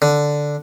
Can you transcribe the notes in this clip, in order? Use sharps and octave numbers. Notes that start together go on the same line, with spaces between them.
D3